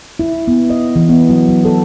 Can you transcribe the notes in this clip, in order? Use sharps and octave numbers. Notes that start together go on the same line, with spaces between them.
E4
B3
D#5
E3
B3
F#3
F#3
A4